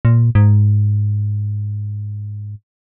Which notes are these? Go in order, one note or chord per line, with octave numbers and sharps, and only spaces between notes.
A#2
G#2